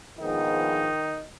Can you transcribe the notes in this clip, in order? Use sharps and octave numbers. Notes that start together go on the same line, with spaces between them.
A#1 G#2 D#3 F3 G#3 B3 D#4